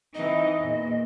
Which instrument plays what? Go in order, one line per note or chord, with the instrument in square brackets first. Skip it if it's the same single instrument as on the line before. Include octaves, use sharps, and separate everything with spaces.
[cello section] E3 C4 D#4 [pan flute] D#5
[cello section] E2 A#2